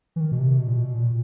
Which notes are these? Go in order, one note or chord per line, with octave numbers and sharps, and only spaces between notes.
E3
D#3
B2
C3
B2
A#2
B2
A#2